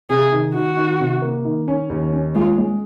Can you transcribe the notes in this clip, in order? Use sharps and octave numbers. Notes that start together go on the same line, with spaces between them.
C3 G#4
D#3
D#3 F#4
D#3
C3
A#3
D#3
C#4
D#2
C#4
G#3 F4
G#3